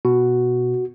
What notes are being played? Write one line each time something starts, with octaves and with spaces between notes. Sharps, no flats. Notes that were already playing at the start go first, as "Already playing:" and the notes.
B2 F#4